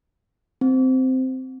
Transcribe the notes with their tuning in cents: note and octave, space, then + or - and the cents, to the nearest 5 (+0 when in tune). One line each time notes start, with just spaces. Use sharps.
C4 -10